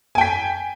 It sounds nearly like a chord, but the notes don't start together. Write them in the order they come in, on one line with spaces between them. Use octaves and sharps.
G#5 G5 B6